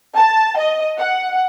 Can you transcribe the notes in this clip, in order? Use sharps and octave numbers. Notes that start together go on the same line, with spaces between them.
A5
D#5
F#5